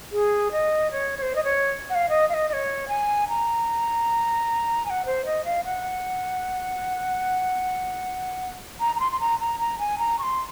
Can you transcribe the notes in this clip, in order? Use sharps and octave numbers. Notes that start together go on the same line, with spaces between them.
G#4
D#5
C#5
C#5
C5
D#5
C#5
F#5
F5
D#5
F5
D#5
D#5
C#5
G#5
A#5
G#5
F#5
C5
D#5
F5
F#5
A#5
A#5
C6
C6
A#5
A#5
A#5
G#5
A#5
C#6
C6